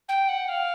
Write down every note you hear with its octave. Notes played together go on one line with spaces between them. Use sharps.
G5
F#5
F5